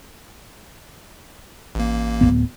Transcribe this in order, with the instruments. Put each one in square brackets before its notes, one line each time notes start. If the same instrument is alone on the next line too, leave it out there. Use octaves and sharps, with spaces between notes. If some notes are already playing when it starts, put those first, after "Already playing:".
[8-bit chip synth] A1 A#3
[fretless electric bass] D1 F#2 B3